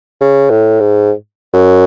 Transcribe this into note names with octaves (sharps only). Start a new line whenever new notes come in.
C#3
A2
G#2
F#2